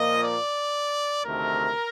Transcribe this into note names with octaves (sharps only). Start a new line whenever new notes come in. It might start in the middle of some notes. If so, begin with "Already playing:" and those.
Already playing: A#2 F3 A#3 D#5
D5
D2 C3 D#3 A3 A#4